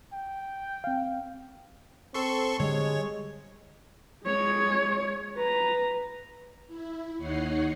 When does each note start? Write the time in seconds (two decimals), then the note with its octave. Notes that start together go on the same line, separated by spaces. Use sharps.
0.13 G5
0.84 C4 F5
2.14 C4 A4 C6 C#6
2.60 D3 G3 G#3 C#5
4.24 G#3 C#5
5.36 B4 A#5
6.67 E4
7.17 D#2 D#4 C#5 F#5 C7